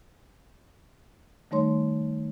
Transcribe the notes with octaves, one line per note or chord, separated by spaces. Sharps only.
D#3 G3 A3 D#4 C#5 C6